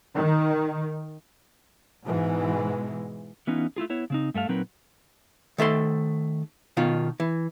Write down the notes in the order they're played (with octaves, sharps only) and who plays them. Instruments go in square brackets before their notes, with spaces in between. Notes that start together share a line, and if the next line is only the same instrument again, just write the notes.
[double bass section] D#3
G#2 B2 E3 G#3
[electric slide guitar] E3 B3 C#4 D#4 F4
A3 E4 F4 G#4
B3 E4 C#5
C#3 C4 D#4
G2 A3 A4 F5
A#2 F#3 C4 D#4 A#4 B4
[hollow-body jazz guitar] D#3 A3 A4 C6
B2 D#3 F4
E3